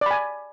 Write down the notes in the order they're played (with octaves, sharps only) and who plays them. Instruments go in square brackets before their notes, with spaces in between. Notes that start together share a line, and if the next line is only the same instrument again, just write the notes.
[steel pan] D5
B5
G#5